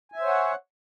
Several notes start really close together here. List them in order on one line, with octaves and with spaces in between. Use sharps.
G#5 E5 C5 C#5 F#5